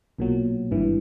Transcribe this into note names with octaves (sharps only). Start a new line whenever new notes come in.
B1 A#2 F#3
G#1 G2 E3